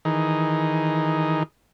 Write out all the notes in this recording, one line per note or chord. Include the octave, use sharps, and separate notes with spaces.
D#3 E3 D#4 G#4